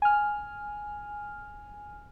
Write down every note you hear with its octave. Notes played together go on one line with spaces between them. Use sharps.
G#5 F6